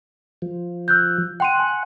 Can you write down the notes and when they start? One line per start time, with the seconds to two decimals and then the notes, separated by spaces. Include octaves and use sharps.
0.42 F3
0.88 E6 F#6 G6
1.40 F#5 G5 C6 D#7
1.60 G#5